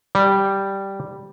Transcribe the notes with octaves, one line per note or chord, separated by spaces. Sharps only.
G3